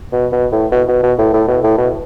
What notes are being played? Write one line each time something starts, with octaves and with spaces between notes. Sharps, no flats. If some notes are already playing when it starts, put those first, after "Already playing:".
B2
B2
A2
B2
B2
B2
A2
A2
B2
A2
B2